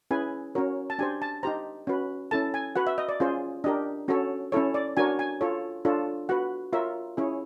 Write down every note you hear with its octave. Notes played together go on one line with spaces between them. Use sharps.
C#4 E4 G#4 B4 G#5
C#4 F#4 A#4 C#5
A5
D4 G4 C5 G#5
A5
D#4 G4 C5 A#5
C#4 F#4 B4
C#4 E4 A4 A5
G#5
F#4 B4 F#5
E5
D#5
D5
C#4 F4 G#4 C5
D4 G4 A#4 D#5
C#4 F#4 A4 C#5
C#4 E4 A4 C#5
D5
D4 F#4 A#4 C#5 G#5
G#5
F4 A4 C#5
D4 F4 A4 C#5
F#4 B4 F#5
F4 A#4 C#5 E5
C#4 E4 G#4 C#5